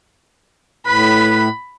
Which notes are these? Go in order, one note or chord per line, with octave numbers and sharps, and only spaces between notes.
A2 B4 B5